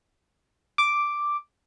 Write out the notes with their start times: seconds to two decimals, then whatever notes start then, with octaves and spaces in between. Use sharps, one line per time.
0.78 D6